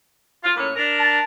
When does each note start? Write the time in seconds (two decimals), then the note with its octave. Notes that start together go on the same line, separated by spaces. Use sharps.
0.44 F4
0.56 A2 A#3 C#4
0.76 D4 A#4
1.00 A5